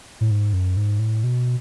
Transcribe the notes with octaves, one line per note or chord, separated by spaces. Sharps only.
A2
G#2
F#2
G#2
A2
B2